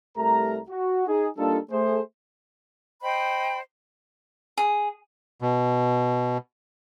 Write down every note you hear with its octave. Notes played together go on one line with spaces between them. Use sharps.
C2 A3 G4 A#4 A#5
F#4
D#4 G#4
G3 A#3 D4 D#4 F4 A4
A3 G#4 C5
C5 D#5 G5 B5
G#4
B2